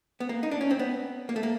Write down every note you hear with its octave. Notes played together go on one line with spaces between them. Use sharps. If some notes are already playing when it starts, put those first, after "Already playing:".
B3
A#3
D#4
D4
C#4
C4
B3
A#3
A3
A#3